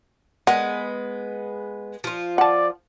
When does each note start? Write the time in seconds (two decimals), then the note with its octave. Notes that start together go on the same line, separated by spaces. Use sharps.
0.47 G#3 B3 A#4 F#5
2.04 F3 F4
2.38 D5 F#5 A5